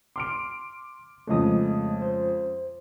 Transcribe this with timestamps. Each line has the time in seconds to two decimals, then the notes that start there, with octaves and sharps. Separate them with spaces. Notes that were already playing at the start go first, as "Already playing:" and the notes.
0.16 C6 D6 F6 D7
1.27 F2 C#3 G#3 A3 D#5 D#6
2.02 C5